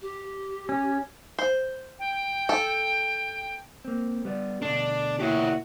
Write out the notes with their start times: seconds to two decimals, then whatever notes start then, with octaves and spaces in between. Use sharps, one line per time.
0.01 G4
0.69 C#4
1.39 C5
1.99 G5
2.49 A4
3.85 A#3 C4
4.25 G3 B3 D5
4.62 D2 B2 A3 D4
5.19 A#2 E4 F#4 G4 C#5